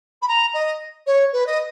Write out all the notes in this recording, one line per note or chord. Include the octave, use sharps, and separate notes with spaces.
B5
A#5
D#5
C#5
B4
D#5